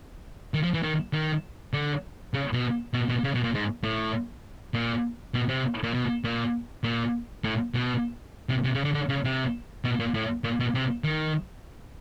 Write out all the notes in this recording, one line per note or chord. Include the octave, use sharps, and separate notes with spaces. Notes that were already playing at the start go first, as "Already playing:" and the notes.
D#3
F3
E3
D#3
D#3
D3
C#3
B2
B2
B2
C#3
B2
A#2
G#2
A2
A#2
B2
C3
A#2
B2
A#2
A#2
A2
B2
C3
C3
C#3
D3
D3
C#3
C3
B2
A#2
A2
A#2
B2
C3
D#3